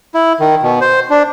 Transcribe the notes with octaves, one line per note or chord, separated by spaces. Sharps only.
E4
D#3
B2
C5
D4